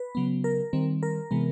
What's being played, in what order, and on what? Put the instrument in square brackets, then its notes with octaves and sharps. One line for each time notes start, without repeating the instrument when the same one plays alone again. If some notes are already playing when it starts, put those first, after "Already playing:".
Already playing: [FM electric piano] B4
C#3 F#3 B3
A#4
D#3 G3 C4
A#4
C3 E3 G#3 B3